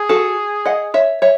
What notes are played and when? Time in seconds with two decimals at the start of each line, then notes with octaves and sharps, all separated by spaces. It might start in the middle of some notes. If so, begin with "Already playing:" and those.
Already playing: G#4
0.09 F#4 A4
0.66 D#5 F#5
0.94 C#5 E5
1.22 C#5 E5